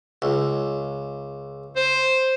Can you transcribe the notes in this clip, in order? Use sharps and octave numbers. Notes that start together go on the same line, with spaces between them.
C#2
C5